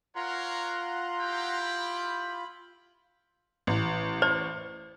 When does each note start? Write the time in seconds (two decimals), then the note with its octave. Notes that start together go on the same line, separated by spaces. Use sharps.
0.16 F4 A#4 C#5 F#5 A#5 C6
1.20 E4 G4 G5
1.62 B5
3.67 A1
4.22 C5 D5